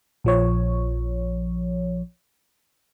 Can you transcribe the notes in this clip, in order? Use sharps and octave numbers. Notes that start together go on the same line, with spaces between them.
A#1 F3 C#5